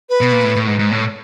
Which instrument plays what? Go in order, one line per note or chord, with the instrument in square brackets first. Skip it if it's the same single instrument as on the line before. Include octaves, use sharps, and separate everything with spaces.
[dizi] B4
[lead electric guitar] B2
A#2
A2
A2
G#2
G#2
A2